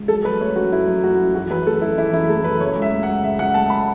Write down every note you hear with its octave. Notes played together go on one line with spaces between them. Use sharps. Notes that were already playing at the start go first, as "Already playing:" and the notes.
Already playing: C#2
F#3 A4
F#2 B4
A3 C#5
F#2 F#4
F#3 E4
F#2
A3 F#4
F#2
E3 F#4
F#2 B4
A3 A4
F#2 E4
E3 E4
F#2 E4
A3 A4
F#2 B4
C#3 C#5
C#2
E5
A3
F#5
C#2
C#3 E5
C#2 F#5
A3 A5
B5